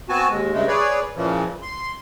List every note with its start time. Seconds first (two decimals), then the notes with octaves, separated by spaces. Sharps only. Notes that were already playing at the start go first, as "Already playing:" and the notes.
0.09 B3 C4 F#4 G#5 A5
0.30 D#2 G#3
0.53 G2 C#3 G#3 A3
0.68 G#4 B4 C#5 D5
1.16 A#2 C#3 E3 F3
1.62 C6